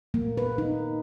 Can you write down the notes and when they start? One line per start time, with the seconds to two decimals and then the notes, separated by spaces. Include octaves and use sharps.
0.14 A#3
0.37 B4
0.58 D#4